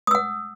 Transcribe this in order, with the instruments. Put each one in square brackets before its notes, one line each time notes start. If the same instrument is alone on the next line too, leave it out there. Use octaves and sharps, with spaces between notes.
[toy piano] D#6
E6
F#5